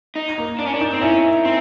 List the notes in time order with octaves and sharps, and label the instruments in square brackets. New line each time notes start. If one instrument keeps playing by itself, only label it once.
[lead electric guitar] D#4
[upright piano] A#3
[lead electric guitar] D4
C#4
D4
[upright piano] D#4
[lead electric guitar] C4
[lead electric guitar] C#4 [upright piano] E4
[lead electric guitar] C4